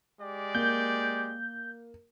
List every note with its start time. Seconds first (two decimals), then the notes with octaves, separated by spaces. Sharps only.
0.19 G#3 G4 D5
0.55 A#3 G6